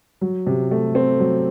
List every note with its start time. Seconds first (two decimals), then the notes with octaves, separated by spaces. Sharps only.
0.21 F#3
0.47 C3
0.71 A3
0.95 C4
1.20 F#3